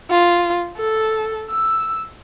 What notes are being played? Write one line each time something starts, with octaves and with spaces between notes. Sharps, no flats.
F4
A4
E6